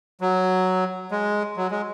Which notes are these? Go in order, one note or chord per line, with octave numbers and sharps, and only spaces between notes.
F#3
G#3
F#3
G#3